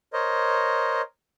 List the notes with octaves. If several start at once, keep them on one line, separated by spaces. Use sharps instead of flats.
A#4 C5 C#5 D#5